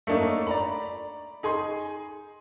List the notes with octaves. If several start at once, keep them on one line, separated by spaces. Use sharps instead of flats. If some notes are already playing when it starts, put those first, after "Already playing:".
A3 A#3 D4 D#4 C#5
D5 A#5 B5
D#4 G#4 G#5 C6